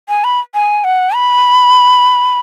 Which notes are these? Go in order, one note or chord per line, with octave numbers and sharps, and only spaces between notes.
G#5
B5
G#5
F#5
B5